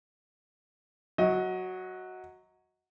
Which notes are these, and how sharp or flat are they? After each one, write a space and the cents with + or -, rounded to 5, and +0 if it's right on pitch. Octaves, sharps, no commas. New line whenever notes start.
F#3 +0 D#5 +30